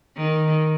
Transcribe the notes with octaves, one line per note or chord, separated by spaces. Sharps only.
D#3